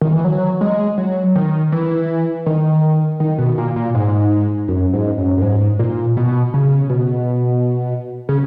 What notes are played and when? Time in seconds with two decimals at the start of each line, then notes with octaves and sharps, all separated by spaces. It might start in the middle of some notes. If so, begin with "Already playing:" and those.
0.01 D#3
0.13 E3
0.24 F#3
0.61 G#3
0.98 F#3
1.35 D#3
1.72 E3
2.46 D#3
3.20 D#3
3.38 B2
3.58 A#2
3.76 A#2
3.95 G#2
4.68 F#2
4.93 G#2
5.18 F#2
5.38 F#2
5.42 G#2
5.79 A#2
6.17 B2
6.54 C#3
6.90 B2
8.29 C#3